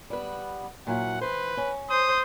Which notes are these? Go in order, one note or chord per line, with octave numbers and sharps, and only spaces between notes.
G3 B3 B4
A#2 F#3 E4 F#5
E3 B4 C5
C#4
C5 D#6